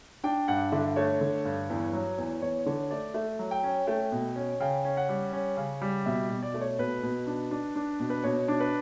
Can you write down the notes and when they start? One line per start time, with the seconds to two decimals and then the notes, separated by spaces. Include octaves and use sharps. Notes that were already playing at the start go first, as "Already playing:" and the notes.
0.24 D4 G5
0.48 G2 F#5
0.72 D3 E5
0.96 A3 C#5
1.21 D3
1.45 G2
1.70 E2
1.93 F#3
2.18 E2
2.42 E2 C#5
2.66 D3 C#5
2.91 A3 D5
3.14 A3 E5
3.39 F#3
3.51 G5
3.63 C#4
3.87 A3 G5
4.12 B2
4.36 C#4
4.60 C#3 G5
4.85 C#4
4.97 F#5
5.09 G3
5.33 C#4
5.57 C#3
5.82 G3
6.06 B2 E5
6.30 B2
6.42 D5
6.54 A3
6.61 C#5
6.79 B2 B4
7.03 B2
7.27 D4
7.51 D4
7.76 D4
8.00 B2
8.10 B4
8.24 B2 C#5
8.48 D4
8.60 B4